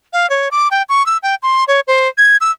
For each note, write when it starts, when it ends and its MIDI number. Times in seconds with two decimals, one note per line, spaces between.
0.13 0.29 77
0.30 0.49 73
0.51 0.68 86
0.71 0.82 79
0.89 1.05 85
1.06 1.18 88
1.23 1.35 79
1.42 1.64 84
1.68 1.80 73
1.87 2.08 72
2.18 2.37 92
2.41 2.51 88